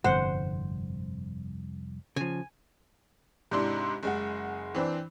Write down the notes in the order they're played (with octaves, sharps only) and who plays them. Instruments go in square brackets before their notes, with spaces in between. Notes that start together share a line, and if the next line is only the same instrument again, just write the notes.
[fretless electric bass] G1 D3 [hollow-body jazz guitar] C2 F2 [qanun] C5 [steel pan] F#5
[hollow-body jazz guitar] C#3 F3 [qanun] G#5
[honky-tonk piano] G#2 C3 D4 E4 C6
F#1 G#3 F#5
E3 C4 D4